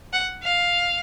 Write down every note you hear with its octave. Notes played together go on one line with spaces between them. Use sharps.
F#5
F5